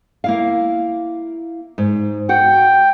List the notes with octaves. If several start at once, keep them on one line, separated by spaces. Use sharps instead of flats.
A#3 E4 F5
G#2
F#4 F#5 G5